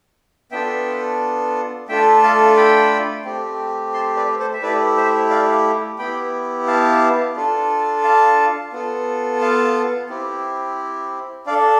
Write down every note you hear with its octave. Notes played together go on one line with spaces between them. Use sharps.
B3 D4 F4 A4 E5 G5
A3 D4 F4 A4 E5 G5
F5 A5
G5 B5
A3 C4 G4
A5 C6
B4 D5
A4 C5
E5
A3 E4 G4 B4 D5
C5 E5
D5 F5
B3 E4 G4 G5 B5
F5 A5
D4 F4 A4
F5 A5
B3 F4 A4
F5 A5
C4 E4 G4
D4 A4 D5 F5